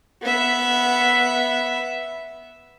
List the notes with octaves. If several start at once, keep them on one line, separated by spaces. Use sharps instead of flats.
B3 E5